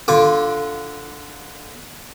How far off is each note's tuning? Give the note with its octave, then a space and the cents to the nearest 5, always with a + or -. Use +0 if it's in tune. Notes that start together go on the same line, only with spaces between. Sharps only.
D3 +0 F4 +0 D6 +0